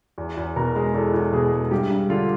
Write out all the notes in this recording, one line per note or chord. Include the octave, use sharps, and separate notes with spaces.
E2
E2
B2 A#4
G#3
E2 A4
E2
B2 G#4
G#3
G2 G4
G2
D3 F4